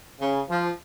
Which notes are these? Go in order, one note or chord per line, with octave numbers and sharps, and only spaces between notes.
C#3
F3